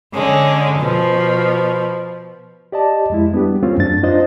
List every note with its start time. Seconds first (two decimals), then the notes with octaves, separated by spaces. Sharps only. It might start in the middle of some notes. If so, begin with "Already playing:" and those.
0.14 D3 G#3 C#4
0.80 B2 F3
2.72 G4 D5 D#5 A5
3.10 F2 G#3 E4
3.32 G3 B3 D4 G4
3.63 A3 A#3 C4 C#4 F4
3.78 F#2 D4 A6
4.03 D4 D#4 F4 C5 D#5